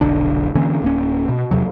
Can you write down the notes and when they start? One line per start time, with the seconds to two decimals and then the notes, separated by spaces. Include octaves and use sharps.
0.01 F1 B1 D3 D4
0.55 D3 E3 A#3 C#4
0.82 D1 A#3 C#4
1.29 B2
1.51 E2 C3 F#3